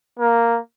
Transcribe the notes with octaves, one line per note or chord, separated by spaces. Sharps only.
A#3